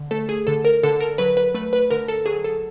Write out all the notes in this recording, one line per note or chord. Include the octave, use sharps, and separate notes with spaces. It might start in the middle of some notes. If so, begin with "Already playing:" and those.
Already playing: D3
A3 A4
G#4
D3 A4
A#4
D3 A4
A#4
F#3 B4
B4
A3 B4
B4
D3 A#4
A4
F#3 G#4
A4